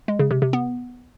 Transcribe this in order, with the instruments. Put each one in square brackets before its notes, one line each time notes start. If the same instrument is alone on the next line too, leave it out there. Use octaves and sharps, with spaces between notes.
[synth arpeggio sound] G#3
C#3
C3
C3
B3